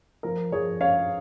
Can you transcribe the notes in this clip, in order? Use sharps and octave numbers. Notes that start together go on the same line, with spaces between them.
F3 A#4
F3 G#4 C#5
C#4 C#5 F5